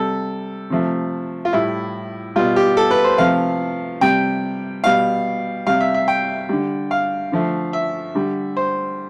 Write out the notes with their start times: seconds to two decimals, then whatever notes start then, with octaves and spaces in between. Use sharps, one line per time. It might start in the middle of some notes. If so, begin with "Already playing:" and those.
Already playing: C3 G3 A4
0.70 C3 F3 A3
1.45 F4
1.53 A2 G3 E4
2.36 B2 G3 F4
2.56 G4
2.77 A4
2.91 B4
3.04 C5
3.18 C3 F3 A3 F5
4.01 C3 G3 G5
4.84 B2 G3 F5
5.67 C3 G3 F5
5.80 E5
5.94 E5
6.08 G5
6.49 D3 G3
6.91 F5
7.32 D3 F3 A3
7.73 E5
8.15 D3 G3
8.57 C5